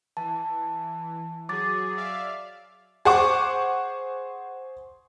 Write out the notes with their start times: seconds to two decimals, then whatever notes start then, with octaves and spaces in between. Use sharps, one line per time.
0.17 E3 A5
1.49 F#3 G#4 D6 A6
1.97 D5 E5 F5
3.05 G#4 C5 F#5 C#6 D6